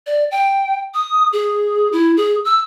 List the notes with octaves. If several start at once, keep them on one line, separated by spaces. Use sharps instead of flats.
D5
G5
D#6
G#4
E4
G#4
E6